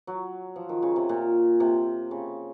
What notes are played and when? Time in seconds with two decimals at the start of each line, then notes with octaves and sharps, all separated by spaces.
0.07 F#3
0.56 F3
0.69 D#3
0.82 C#3
0.96 C3
1.09 A#2
1.60 C3
2.11 C#3